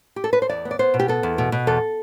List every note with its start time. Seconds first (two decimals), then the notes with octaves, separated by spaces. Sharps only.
0.16 G4
0.24 A4
0.33 B4
0.42 C5
0.49 E2 D5
0.65 B3
0.71 D5
0.79 B3 C5
0.94 B2
1.00 G4
1.08 B3 A4
1.23 E2
1.38 B2
1.52 B2
1.67 E2 A4